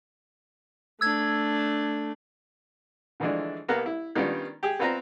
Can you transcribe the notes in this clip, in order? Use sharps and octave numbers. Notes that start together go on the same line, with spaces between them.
A3 D4 E6 G#6
D3 E3 F3 G#3 A3 D4
C2 A#3 B3 F5 A#5 F#6
E4
D#3 G3 B3 C#4 D4 F4
G4 G#4
B3 C4 F4 B4 C5 A#5